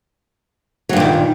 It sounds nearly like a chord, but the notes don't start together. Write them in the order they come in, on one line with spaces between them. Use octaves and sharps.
F#3 G2 A#2 D#3